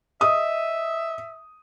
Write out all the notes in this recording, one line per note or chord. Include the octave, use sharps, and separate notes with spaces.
D#5 E5 D#6